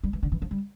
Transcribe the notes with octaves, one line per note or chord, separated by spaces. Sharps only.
G3
E3
D3
E3
F3
G3